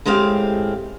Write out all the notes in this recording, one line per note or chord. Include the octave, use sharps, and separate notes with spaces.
A2 G#3 C4 G4 F5